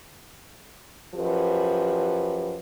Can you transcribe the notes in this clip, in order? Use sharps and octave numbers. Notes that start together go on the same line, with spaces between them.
F#2 F3 G4 B4